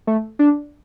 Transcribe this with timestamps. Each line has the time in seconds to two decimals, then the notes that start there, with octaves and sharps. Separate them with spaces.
0.07 A3
0.39 D4